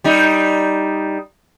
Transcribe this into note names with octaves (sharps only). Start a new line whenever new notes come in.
G3 D#4